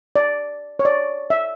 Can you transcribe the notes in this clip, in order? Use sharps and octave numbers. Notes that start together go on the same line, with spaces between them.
D5
C#5
D5
E5